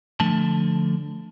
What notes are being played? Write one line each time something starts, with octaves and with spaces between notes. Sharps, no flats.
D3 F3 A3 A5